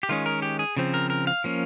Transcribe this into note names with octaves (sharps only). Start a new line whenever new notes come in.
G4
D#3 G#3 C#4 F4
A#4
G4
G#4
C#3 F3 C4
A#4
A#4
F5
F3 A#3 C#4